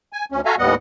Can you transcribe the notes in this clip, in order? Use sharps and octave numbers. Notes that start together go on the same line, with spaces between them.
G#5
D2 C#4
F#4 A4 E5 F5 G#5 A#5
D#2 A2 G3 B3 D#5 F#5